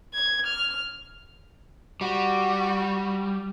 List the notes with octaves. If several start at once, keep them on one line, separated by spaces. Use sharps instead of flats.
G#6
F6
G3 F#4